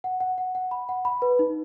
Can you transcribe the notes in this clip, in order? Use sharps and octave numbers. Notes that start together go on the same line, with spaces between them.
F#5
F#5
F#5
F#5
B5
F#5
B5
B4
D#4